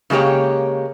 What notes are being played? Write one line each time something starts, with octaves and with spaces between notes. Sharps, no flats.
C#3 G#3 A#3 G4 C#5